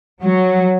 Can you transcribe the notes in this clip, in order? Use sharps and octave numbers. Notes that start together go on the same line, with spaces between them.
F#3